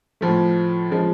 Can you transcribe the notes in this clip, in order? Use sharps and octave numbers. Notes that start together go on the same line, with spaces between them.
A2 F3 A3
C#3 F3 G#3